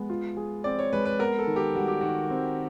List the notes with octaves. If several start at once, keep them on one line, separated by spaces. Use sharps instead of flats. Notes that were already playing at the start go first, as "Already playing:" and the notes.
Already playing: G#3 B3
F4
G#4
C4 D5
C#5
G#3 B4
B4
B3 A#4
A4
D#3
G4
G3 F#4
G4
D#3 F#4
C4